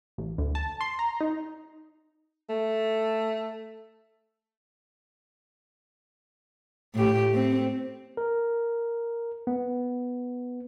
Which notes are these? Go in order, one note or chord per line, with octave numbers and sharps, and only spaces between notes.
A1
D2
A5
C6
A#5
D#4
A3
A2 G4
A3 C4
A#4
B3